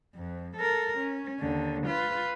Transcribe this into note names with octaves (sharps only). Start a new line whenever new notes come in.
F2
A4 A#4
C#4
D#2 D3
F4 B4